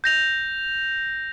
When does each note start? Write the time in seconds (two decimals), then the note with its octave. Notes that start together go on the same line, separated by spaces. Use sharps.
0.04 G6 A#6 F7